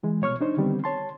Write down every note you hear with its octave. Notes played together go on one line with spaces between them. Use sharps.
C2 E3 G#3
C2 B2 C#5 C#6 F6
D4 D#4 C5
D3 D#3 G3 B3 C4
C#5 A5 C6